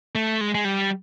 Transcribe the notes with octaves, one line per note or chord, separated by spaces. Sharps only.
A3
G#3
G#3
G3